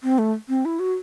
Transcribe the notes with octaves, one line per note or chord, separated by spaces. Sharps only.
C4
A3
C4
E4
F#4